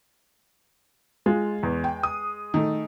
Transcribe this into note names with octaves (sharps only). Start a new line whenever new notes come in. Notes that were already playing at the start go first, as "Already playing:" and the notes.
G#3 F4
E2
G5
D#6
D#3 A3